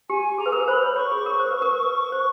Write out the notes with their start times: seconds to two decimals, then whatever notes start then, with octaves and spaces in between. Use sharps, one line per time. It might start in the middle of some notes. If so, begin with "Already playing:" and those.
0.10 G4 G#5
0.38 G#4 A#5
0.46 B4
0.52 A#4
0.62 B4
0.68 C5 B5
0.82 C#5
0.96 C#5 C#6
1.12 G#4
1.26 A#4
1.39 C5
1.51 B4
1.62 A#4
1.72 B4
2.12 C5